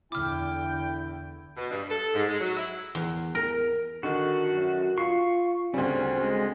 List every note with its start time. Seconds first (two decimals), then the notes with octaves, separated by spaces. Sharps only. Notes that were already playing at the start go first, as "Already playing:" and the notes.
0.12 E2 D3 E4 G5 D6 F6
1.57 B2
1.71 G2
1.89 A4
2.13 G#2
2.28 G#3
2.40 F#3
2.57 E4
2.95 E2
3.35 A#4
4.03 D3 D#3 F#4
4.53 F#2
4.98 F4 C#6 C7
5.74 D2 C#3 G3 C4 C#4
6.20 G#3